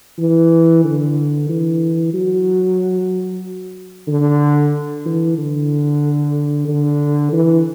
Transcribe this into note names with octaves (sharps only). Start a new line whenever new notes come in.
E3
D3
E3
F#3
D3
E3
D3
D3
E3